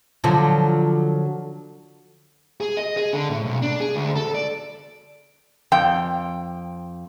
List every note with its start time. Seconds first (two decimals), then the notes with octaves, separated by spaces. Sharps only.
0.24 D3 F3 F#3
2.61 G#4
2.77 D#5
2.97 G#4
3.13 D3
3.30 A2
3.46 B1
3.62 D4
3.80 G#4
3.95 D2
4.16 A4
4.35 D5
5.72 F2 G5